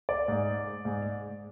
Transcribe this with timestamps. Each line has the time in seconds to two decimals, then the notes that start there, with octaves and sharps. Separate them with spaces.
0.09 D5
0.28 G#2 G#3
0.85 G#2 G#3